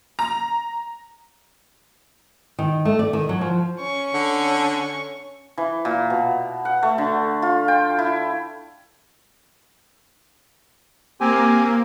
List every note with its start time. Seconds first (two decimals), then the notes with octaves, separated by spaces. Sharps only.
0.19 A#5
2.59 D#3
2.85 A3
2.99 D5
3.13 D#3
3.29 F#3
3.41 F3
3.80 C#4 C#6
4.14 D3
5.57 E3
5.85 A#2
6.10 B2
6.65 F#5
6.83 A3
6.98 D3
7.42 F4
7.68 G5
7.99 E4
11.20 A#3 C4 G4 G#5